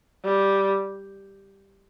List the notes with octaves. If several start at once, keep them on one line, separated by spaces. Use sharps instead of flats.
G3